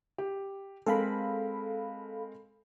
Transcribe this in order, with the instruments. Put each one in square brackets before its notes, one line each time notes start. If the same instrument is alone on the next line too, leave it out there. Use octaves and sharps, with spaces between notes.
[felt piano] G4
[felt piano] G#3 C4 A#4 [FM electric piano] A4 F5 B5